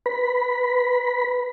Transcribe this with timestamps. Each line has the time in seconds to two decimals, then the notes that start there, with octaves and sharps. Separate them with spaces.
0.06 B4 B5